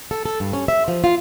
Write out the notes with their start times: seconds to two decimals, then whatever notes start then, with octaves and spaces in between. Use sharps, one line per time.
0.11 A4
0.26 A4
0.40 G2
0.53 C#4
0.68 E5
0.88 F3
1.04 F4